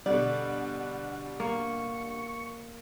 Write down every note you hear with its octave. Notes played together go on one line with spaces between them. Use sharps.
B2 D3 G3 D5 F#5
A#3 C#6